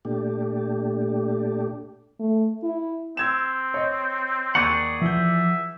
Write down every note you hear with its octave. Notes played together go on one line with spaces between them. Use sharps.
A#2 A3 D4 G4
A3
E4
C4 E6 G#6 E7
C#5 D#5
D#2 G#4 D5 F#5 C#6
E3 F3 E5 G6